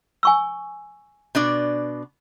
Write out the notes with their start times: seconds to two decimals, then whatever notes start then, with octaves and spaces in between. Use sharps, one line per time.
0.23 G#5 C#6 E6
1.35 B2 D4 D5